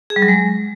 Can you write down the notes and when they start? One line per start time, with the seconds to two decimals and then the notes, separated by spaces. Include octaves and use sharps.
0.10 G#4
0.16 G3
0.22 F#3
0.28 G#3